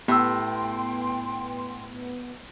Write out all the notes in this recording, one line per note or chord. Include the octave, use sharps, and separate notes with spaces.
A2 B3 G4 G5 C6 E6